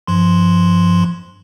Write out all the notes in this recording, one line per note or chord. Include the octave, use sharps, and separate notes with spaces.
G2 F3 C6